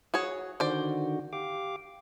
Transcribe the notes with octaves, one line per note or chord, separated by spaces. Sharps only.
F#4 G#4 C#5
D3 D#3 F#4 C5 D5
G4 F5 D6